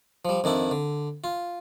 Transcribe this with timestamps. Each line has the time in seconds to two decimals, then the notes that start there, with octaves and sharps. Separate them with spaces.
0.25 F3 G3
0.44 F2 D#3 D4 E4
0.71 D3
1.24 F4